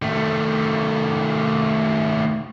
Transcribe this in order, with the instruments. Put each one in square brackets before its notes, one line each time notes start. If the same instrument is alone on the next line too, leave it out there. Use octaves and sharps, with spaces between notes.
[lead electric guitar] D#3 A3